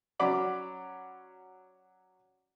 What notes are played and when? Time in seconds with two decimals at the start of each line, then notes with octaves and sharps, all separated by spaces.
0.19 F#3 C#4 F#4 D5 B5